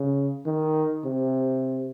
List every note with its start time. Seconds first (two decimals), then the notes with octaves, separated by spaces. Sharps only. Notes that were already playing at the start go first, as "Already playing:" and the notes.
Already playing: C#3
0.46 D#3
1.05 C3